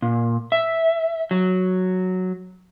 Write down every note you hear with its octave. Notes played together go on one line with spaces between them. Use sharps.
A#2
E5
F#3